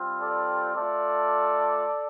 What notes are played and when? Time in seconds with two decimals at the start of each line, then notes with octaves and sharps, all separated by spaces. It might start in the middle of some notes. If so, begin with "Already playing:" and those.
Already playing: G3 C4 F4
0.21 A4 D5
0.76 A3 F4 A4 D5